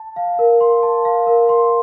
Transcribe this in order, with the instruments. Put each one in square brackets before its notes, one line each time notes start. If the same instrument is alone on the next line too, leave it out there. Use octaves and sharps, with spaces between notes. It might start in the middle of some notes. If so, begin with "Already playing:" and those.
Already playing: [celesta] A5
F5
A#4
C6
A5
F5
A#4
C6